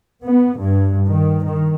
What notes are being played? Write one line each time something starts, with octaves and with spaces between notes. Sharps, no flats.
B3
G2
D#3
D#3